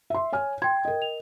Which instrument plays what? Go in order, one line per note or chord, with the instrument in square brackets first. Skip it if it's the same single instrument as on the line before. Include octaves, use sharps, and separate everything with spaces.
[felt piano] E5 C6
C#5 G#5 F6
[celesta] G5 G#6 [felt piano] C6
[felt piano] A#4 D#5
[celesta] F7